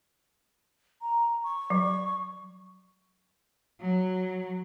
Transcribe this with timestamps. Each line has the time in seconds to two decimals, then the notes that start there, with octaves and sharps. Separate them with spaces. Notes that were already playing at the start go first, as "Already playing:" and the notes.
1.01 A#5
1.44 C#6
1.70 F#3
3.81 F#3